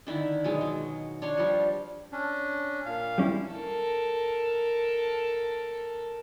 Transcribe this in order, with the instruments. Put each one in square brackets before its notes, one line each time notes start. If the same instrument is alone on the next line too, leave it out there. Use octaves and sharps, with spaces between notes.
[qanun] D3 D#3 E4 B5
B2 F#3 G#3
F#3
D4 C#5 C6
F3 G3
[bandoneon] C#4 D4
A#2 F5
[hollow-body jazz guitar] G3 C#4 E4
[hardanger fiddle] A4 A#4